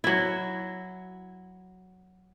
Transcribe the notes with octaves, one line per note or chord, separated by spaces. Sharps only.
F#3 E4